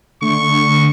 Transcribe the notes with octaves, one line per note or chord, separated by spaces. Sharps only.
D3 A3 C#6